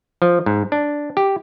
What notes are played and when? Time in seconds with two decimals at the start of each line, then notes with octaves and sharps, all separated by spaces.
0.22 F3
0.46 G#2
0.72 D4
1.17 G4